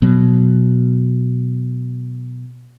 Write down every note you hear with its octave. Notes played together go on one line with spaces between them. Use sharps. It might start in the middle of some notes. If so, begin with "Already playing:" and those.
B2 F#3